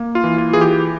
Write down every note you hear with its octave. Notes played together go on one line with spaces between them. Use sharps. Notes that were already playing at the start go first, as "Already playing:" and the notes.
Already playing: A#3
F4
E3
F4
E3 G#4
G4